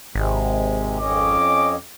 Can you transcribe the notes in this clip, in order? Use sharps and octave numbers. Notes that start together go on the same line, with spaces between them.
G#1 C3 G#3
F2 C#4 D#5 D6